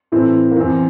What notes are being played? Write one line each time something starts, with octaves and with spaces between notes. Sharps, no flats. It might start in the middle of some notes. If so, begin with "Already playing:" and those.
A2 E3 C4 E4
A#3
E2 E3 C4